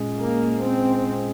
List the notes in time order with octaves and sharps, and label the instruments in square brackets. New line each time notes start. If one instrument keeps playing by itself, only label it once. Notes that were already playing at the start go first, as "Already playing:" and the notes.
Already playing: [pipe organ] A#2 G#3 C#4 G#4
[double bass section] A#3
C4